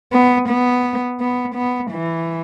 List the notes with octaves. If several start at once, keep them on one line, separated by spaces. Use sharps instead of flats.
B3
B3
B3
B3
E3